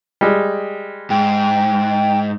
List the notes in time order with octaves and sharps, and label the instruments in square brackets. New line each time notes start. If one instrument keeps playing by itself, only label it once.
[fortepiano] G3 G#3
[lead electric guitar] G#2 [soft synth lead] G5